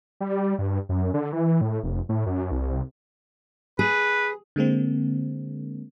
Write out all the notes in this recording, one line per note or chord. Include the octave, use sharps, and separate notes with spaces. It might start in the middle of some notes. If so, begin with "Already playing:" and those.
G3
G2
F#2
D3
E3
A2
F1
A2
F#2
C2
G#4 B4
D3 G#3 A#3 C4